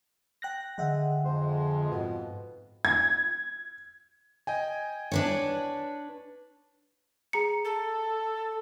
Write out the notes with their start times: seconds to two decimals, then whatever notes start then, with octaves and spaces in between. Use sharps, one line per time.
0.42 G5 F#6 A#6
0.78 D3 G#3 E5 F#5 G5
1.25 F2 G#3 C5
1.91 G#2 B2
2.85 G#6
4.47 D#5 G5 G#5
5.12 D4 B4 C#5
7.33 G#4 A#5 C#7
7.65 A4